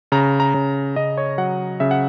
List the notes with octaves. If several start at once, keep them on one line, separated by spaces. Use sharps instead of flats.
C#3 A#5
A#5
C#3
C#3 D#5
C#5
F#3 F#5
C#3 E5
F#5